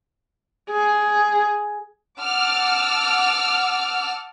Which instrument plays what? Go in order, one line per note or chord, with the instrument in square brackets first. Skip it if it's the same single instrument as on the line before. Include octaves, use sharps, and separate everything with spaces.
[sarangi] G#4
[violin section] F#5 A5 D6 E6 F6